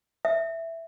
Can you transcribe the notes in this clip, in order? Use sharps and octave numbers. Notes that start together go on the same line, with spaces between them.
E5